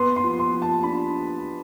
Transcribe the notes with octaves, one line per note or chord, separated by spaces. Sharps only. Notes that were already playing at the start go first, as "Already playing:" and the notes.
Already playing: B3 C6
C6
F3
C6
F3
A5
D4 B5